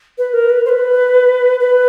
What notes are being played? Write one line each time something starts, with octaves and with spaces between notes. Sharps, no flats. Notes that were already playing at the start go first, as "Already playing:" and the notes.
B4
A#4
B4
C5
B4
B4